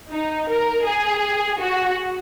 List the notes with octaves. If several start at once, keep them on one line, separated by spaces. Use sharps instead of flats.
D#4
A#4
G#4
F#4